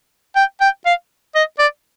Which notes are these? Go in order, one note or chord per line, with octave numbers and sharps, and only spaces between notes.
G5
G5
F5
D#5
D5